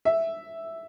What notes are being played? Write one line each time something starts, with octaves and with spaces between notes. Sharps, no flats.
E5